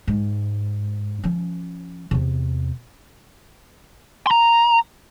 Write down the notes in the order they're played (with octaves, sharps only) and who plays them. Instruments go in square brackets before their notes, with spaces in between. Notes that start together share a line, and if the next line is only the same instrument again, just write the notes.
[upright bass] G#2
F3 C#4
E2 C3
[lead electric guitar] A#5 C6